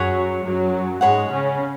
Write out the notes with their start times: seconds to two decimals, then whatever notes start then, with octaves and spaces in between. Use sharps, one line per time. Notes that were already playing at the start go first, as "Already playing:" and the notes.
Already playing: F#2 F#3 G#4 C#5 F#5 B5
0.44 F#2 F#3
1.01 G#2 G#3 G#4 C#5 F#5 B5
1.30 C#3 C#4